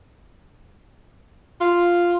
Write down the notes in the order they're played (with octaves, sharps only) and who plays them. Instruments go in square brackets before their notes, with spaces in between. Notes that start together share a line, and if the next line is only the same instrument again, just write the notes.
[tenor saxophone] F4